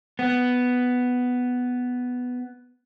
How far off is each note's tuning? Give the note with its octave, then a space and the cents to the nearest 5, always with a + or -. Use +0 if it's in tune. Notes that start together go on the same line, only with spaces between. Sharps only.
B3 +5